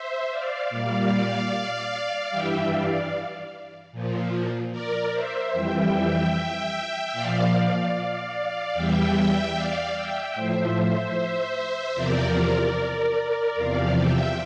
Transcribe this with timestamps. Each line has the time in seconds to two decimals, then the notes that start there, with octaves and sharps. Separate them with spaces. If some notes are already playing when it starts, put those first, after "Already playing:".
Already playing: C5 E5
0.30 D5 F5
0.70 A#2 G3 D5 F5
2.31 G2 E3 G3 E5 G5
2.71 D5 F5
3.92 A#2 F3
4.72 A#4 D5
5.12 C5 E5
5.53 F2 E3 G3 E5 G5
7.13 A#2 F3 D5 F5
8.73 E2 E3 G3 E5 G5
9.14 E5 G5
9.54 D5 F5
9.94 E5 G5
10.34 A2 F3 C5 E5
11.95 E2 C3 F3 A#4 D5
13.56 E2 C3 F3 D5 F5
13.96 E5 G5